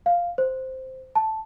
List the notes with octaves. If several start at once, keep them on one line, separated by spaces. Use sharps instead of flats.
F5
C5
A5